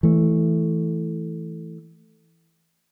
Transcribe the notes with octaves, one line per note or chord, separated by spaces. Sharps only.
E3 A3